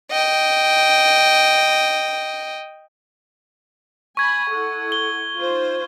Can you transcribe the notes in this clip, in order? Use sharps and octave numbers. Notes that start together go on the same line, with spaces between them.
D#5 G5
G#5 B5 C#6 G#6
E4 A4 F#5
G7
D#4 F4 C5